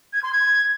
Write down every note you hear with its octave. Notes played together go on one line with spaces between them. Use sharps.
G#6
C6
G#6